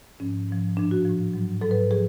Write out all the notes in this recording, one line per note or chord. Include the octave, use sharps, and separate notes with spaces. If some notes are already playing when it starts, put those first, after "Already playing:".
G#2 F3 C#4
G#2 F3
A2 F3 D4
F#4
A2 F3
G#2 F#3
G#2 F#3 A4
B4
F3 G#4